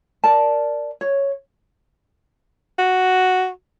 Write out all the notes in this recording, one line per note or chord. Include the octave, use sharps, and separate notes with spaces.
A#4 D5 A5
C#5
F#4